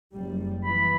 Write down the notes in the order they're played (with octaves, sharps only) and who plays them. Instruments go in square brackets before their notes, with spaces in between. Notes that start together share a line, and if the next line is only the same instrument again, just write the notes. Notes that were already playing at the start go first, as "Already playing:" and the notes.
[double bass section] F#1 G3
[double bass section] E3 [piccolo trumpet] B5